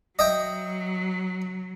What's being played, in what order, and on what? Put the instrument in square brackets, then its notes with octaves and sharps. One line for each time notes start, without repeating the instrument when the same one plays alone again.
[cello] F#3 [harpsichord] D#5 E5 G5